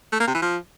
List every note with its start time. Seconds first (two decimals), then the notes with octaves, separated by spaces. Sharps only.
0.13 A3
0.20 A#3
0.27 C3
0.35 E3
0.42 F3